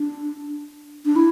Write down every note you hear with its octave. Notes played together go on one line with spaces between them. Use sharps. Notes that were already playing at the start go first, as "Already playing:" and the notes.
Already playing: D4
D4
E4